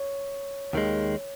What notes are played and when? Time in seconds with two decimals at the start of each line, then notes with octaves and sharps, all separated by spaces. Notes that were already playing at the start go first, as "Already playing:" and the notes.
Already playing: C#5
0.73 D#2 D#3 G#3